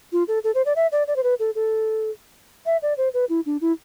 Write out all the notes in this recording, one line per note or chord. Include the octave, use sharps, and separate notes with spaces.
F4
A4
A4
C5
D5
E5
D5
D5
C5
B4
A4
A4
E5
D5
C5
B4
E4
D4
E4